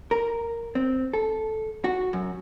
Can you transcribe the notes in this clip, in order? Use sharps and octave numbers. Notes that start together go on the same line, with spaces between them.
A#4
C4
A4
F#4
F#2